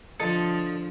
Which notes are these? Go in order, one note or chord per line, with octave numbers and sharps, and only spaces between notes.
D3 F3 A4 D#5 A5